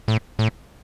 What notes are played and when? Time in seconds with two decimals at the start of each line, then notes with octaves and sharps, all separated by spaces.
0.08 A2
0.39 A2